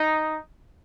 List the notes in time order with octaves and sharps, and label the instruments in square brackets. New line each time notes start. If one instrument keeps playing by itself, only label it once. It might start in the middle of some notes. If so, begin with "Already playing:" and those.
Already playing: [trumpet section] D#4